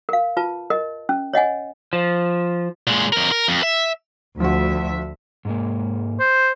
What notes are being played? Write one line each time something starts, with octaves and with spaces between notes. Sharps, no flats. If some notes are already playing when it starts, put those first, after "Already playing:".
A#4 F5
F4 B4 A5
A#4 D#5
C#4
C#5 D#5 F#5 G#5
F3
A#2 G#3
F2 A#4
A#4
F2
E5
D2 F3 F#4 E5
G#2 G#3 A#3
C5